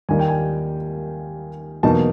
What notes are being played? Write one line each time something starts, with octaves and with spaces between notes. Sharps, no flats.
D#2 D#3 G3 A#3 D#4 G#5
G5
G#5
E2 B2 F#3 A#3 D#4 A5